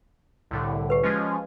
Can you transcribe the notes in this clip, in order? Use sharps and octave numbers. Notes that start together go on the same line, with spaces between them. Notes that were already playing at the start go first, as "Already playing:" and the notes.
C2 A2 D3
G4 B4
F3 G#3 C#4